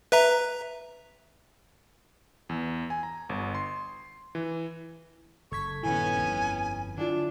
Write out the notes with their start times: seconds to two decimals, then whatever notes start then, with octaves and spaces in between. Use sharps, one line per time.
0.12 B4 E5 A#5
2.49 E2
2.90 G#5
3.03 A#5
3.29 G1
3.55 C6
4.35 E3
5.52 F#1 A4 C#6 G#6 B6
5.83 D#1 G2 D#3 B3 C#4 E4 G#5
6.19 G1 F2
6.97 D3 F#3 D4 E4 F4